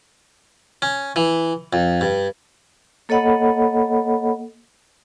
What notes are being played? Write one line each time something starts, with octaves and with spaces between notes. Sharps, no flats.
C#4
E3
F2
G2
A#3 A4 C#5 D#5 F#5 B5